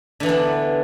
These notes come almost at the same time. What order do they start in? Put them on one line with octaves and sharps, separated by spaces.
D3 E3 D4 B3